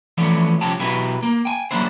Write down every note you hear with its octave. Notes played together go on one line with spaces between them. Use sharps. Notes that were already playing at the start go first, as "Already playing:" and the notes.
E3 F3 A3 B3 C#4 D5
C2 F3 C#4 G4 A5
B2 F#3 E4 G4 B4
A#3
G5 G#5
F#3 G3 A#3 D4 E4 C5